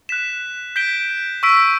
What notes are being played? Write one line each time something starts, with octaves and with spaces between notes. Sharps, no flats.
F#6 B6 E7
G6 B6 D7 G7
C#6 E6 B6 D7